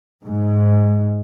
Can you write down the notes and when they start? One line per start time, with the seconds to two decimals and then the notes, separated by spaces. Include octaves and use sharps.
0.24 G#2